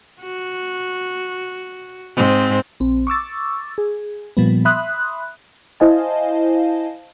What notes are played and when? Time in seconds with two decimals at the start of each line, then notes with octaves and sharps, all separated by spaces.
0.22 F#4
2.16 G#2 C4
2.80 A#1 C4
3.07 C#6 D6 E6 A6
3.78 G#4
4.37 A#2 F3 G3 B3
4.65 E5 B5 C6 D#6 F#6
5.80 E4 C5 D#5 F5 G#5 A5